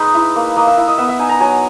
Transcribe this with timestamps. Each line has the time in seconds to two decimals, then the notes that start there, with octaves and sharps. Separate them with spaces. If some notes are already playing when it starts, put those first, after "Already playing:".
Already playing: G#3 D#4 B4
0.14 E4
0.36 A#3
0.56 A#3 D#5
0.67 E5
0.77 E4 E5
0.88 D#5
0.98 B3 E5
1.08 E5
1.19 D#4 G#5
1.29 A#5
1.40 F#3 G#5